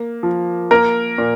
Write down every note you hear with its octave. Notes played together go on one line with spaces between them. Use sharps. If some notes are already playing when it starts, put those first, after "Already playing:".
Already playing: A#3
F3
A#3 A#4
A#2